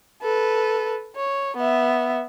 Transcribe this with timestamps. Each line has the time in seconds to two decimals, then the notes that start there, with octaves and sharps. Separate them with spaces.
0.22 A4 B4
1.16 C#5
1.57 B3 E5